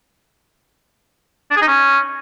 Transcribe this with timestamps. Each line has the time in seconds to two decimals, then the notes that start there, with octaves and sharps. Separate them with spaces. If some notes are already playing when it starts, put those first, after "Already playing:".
1.50 D4
1.56 G#4
1.62 D#4
1.67 C#4